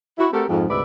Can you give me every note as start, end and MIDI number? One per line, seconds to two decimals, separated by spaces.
0.18 0.27 64
0.18 0.27 66
0.32 0.44 57
0.32 0.44 60
0.32 0.44 66
0.32 0.44 67
0.32 0.44 69
0.32 0.44 70
0.48 0.66 41
0.48 0.66 44
0.69 0.82 38
0.69 0.82 44
0.69 0.82 48
0.69 0.82 71
0.69 0.82 74
0.69 0.82 76